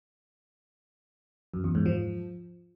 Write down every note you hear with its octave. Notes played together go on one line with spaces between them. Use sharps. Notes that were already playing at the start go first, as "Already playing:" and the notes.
F#2
E2
G#2
F3